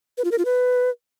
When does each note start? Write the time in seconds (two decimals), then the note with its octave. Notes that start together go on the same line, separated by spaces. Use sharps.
0.18 B4
0.25 F4
0.31 A#4
0.38 F4
0.45 B4